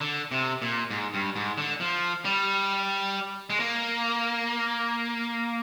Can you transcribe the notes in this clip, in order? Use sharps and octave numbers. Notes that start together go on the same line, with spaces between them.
D3
C3
A#2
G#2
G2
G#2
D3
F3
G3
G#3
A#3